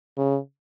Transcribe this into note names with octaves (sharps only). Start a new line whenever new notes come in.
C#3